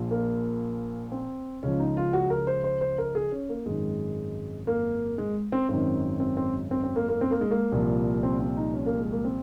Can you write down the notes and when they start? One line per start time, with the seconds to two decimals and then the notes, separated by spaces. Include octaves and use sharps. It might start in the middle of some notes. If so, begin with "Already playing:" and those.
Already playing: A#1 A#2 F3
0.11 A#3
1.12 C4
1.63 C#2 C#3 F3 C#4
1.80 D#4
1.97 F4
2.13 F#4
2.30 A#4
2.47 C5
2.64 C5
2.81 C5
2.98 A#4
3.15 G#4
3.32 C#4
3.49 A#3
3.66 G#1 F#2 D#3 G#3
4.67 A#3
5.18 G#3
5.52 C4
5.69 G#1 F#2 D#3 C4
6.20 C4
6.37 C4
6.71 C4
6.84 C4
6.96 A#3
7.09 A#3
7.21 C4
7.31 A#3
7.41 G#3
7.51 A#3
7.72 C2 A#2 F3
8.23 C4
8.40 C4
8.57 D#4
8.74 C#4
8.86 A#3
8.99 G#3
9.12 A#3
9.25 C4